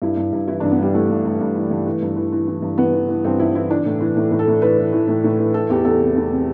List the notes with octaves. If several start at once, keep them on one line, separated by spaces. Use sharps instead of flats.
G2 E4
G2
G2
E3 E4
G2 D4
B3
G2 G3
E3 A3
G2
G2
G2
E3
G2
E3
G2
E3
E3
E3
G2
E3 B3
E3
E3
G2 C4
G2 E4
E3 E4
E3 D4
A2
E3
A2
A2
A4
A2
E3 B4
E3
E3
A2
A2
E3
E3 A4
E2 G4
E2 A4
C3
E2
C3